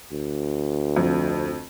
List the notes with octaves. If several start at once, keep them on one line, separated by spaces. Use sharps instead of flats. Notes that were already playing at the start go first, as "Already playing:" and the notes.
D2
F2